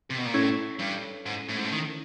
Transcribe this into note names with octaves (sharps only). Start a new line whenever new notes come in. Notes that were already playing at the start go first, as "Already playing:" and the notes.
C3
B2
A#2
A2 C#4 E4 A4 C#5
G2
G#2
A2
G#2
A2
D#3